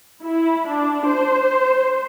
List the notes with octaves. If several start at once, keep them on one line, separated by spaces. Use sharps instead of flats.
E4
D4
C5